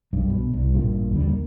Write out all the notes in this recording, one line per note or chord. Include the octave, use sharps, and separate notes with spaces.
B1 G2
B2
C2
A1 G2 A#2
D#2 D3 F#3 G3
A#3